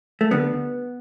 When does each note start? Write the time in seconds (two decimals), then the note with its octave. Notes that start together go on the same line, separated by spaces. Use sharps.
0.21 A3
0.31 D2 D3 G3 B3